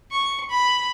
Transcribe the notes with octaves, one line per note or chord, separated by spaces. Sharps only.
C#6
B5